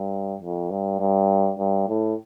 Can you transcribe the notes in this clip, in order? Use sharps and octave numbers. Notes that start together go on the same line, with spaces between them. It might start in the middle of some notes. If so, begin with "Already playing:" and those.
Already playing: G2
F2
G2
G2
G2
A2